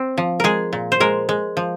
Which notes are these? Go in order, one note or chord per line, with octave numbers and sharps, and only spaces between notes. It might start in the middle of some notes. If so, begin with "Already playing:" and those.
Already playing: C4
F3
G#3 G#4 A#4
A#2
C5
G#3 A#4
G#3
F3